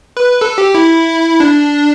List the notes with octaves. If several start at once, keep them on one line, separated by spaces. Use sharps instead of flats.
B4
A4
G4
E4
D4